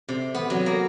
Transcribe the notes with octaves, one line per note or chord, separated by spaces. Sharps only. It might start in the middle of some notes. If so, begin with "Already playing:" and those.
C3
B3
F#3
A#3